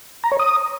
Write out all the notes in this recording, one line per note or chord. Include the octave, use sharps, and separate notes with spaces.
A#5
C#5
D#6